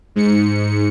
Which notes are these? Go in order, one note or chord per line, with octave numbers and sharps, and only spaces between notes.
G#2 C#7